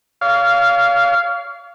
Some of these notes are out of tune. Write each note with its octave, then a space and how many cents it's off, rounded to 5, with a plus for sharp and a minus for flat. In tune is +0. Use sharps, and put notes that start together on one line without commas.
C#5 +45 F5 -10